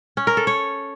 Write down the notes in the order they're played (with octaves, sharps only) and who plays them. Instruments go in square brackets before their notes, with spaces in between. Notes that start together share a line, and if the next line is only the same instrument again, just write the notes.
[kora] C#4
A#4
A4
C#5